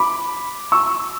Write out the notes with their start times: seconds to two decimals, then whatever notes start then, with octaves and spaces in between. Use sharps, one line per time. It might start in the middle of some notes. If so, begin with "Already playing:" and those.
Already playing: B5 D6
0.72 C#6 E6